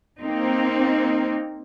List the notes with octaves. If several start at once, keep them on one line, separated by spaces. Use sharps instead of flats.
A#3 C4 D#4